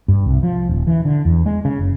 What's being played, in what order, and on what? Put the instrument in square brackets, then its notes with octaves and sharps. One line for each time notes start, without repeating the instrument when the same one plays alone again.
[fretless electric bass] G2
C2
F3
D#1
E3
D3
E2
G#3
C#3
F#1